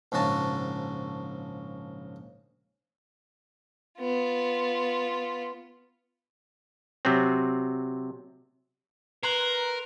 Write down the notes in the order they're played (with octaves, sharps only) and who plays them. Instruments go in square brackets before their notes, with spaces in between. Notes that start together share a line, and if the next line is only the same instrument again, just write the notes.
[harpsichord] A#1 G#2 C#3 F#4 A5
[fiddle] B3 F4
[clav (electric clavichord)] C3 F#3 C4
[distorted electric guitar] A#4 [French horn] B4 [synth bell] A#5 C6 F#6 [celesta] C7 F#7